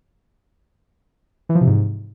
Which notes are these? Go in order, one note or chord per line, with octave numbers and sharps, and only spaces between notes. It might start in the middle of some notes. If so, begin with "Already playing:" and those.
E3
F3
C3
G#2